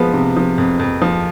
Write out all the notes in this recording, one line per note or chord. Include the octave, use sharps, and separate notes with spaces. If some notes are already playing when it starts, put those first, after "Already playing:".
Already playing: F3 G#3 B3 B4 C5
C3
F3
F2
F2
F3